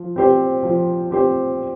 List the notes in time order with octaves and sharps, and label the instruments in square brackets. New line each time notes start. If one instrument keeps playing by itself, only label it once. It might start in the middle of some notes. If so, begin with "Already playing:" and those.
Already playing: [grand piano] F3
C4 G4 C5
F3
C4 G4 C5